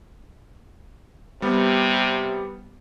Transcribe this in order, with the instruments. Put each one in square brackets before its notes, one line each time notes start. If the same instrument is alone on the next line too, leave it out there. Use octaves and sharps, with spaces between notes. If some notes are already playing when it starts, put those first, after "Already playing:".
[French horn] C3 [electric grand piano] G3 B3